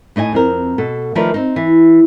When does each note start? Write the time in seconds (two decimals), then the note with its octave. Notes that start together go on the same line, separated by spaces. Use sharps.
0.16 A2 D#4 D#5 G#5
0.33 F2 C4 A#4
0.78 B2 A4
1.15 D#3 F3 A3 A#4 B4 D5
1.34 C4 D#4
1.56 E3